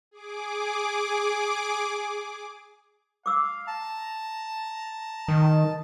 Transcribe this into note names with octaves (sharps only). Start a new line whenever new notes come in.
G#4 D6
F5 D6 E6
A5 A#5
D#3 D#6